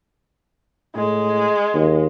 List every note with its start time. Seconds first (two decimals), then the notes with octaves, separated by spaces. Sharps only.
0.96 A2 G#3
1.74 D#2